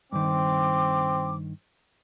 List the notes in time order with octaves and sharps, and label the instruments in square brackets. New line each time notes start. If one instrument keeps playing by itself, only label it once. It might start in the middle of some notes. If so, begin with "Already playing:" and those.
[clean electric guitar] G2 D#3 [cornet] C4 [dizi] D6